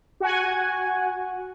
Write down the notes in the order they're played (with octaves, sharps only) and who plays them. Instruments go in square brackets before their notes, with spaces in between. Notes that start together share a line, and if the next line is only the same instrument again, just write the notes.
[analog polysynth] F#4 F#5 G#5